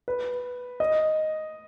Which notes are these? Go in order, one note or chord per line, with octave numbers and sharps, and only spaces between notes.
B4
D#5